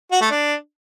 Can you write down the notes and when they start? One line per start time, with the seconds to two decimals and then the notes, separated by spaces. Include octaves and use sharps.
0.12 F#4
0.21 A3
0.31 D4